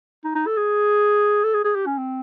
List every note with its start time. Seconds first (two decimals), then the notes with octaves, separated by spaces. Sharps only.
0.24 D#4
0.35 D#4
0.47 A4
0.57 G#4
1.44 A4
1.54 G#4
1.64 G#4
1.75 G4
1.86 C#4
1.98 C4